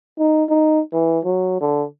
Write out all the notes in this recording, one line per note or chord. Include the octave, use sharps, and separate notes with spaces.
D#4
D#4
E3
F#3
D3